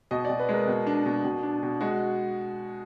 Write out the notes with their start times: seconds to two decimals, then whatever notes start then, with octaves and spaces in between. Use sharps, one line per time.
0.11 B2 D#5
0.25 B2 D5
0.40 B4
0.49 G#3 A#4
0.67 B2
0.87 D4
1.06 B2
1.25 B2
1.43 D4
1.63 B2
1.81 G#3 F#4